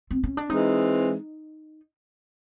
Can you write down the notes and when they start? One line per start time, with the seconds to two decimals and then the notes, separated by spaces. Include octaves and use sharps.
0.11 C4
0.23 C#4
0.37 D4
0.50 E3 G#3 C4 D#4